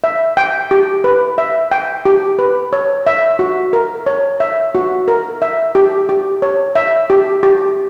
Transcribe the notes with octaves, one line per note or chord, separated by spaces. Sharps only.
E5
G5
G4
B4
E5
G5
G4
B4
C#5
E5
F#4
A#4
C#5
E5
F#4
A#4
E5
G4
G4
C#5
E5
G4
G4